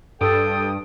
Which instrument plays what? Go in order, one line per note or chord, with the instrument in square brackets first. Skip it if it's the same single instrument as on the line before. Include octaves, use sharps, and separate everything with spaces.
[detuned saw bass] G2 [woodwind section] A4 [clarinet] G5 [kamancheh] D#6